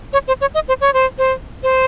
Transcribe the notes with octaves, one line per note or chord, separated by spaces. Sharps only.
C#5
C5
C#5
D#5
C5
C#5
C5
C5
C5